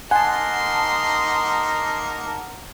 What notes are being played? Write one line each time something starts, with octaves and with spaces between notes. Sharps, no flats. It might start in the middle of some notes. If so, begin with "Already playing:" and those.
A#3 D#4 F#5 G#5 A5 C6